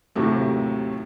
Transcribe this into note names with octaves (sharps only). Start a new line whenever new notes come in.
D#2 A2 C3 F#3 A3